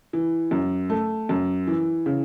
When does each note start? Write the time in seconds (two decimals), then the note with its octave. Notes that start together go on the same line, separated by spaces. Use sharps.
0.13 E3
0.51 F#2
0.90 A3
1.29 F#2
1.67 E3
2.06 C#3